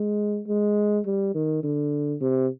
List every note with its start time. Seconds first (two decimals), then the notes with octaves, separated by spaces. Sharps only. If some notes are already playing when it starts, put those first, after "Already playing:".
Already playing: G#3
0.47 G#3
1.06 G3
1.35 D#3
1.63 D3
2.21 C3